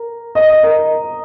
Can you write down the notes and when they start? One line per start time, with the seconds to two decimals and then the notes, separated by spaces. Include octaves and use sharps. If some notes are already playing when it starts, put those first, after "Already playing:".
Already playing: A#4
0.35 D#5
0.49 D#5
0.63 A#4